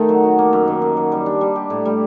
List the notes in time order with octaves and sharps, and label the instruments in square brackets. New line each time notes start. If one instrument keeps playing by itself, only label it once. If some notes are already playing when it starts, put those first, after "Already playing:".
Already playing: [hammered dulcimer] D#3 A3 D#4
F#3
F#4
A#3
F#2
D#3
F#2
F#3
G3
D4
G3
G4
A2
G3